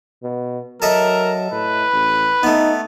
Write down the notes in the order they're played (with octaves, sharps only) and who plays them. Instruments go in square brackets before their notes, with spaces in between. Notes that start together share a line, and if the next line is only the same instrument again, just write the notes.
[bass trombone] B2
[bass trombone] F#3 [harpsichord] A4 D#5 E5 [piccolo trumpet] A#4
[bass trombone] A2 [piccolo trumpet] B4
[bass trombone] A1
[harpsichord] A3 B3 [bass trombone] D#4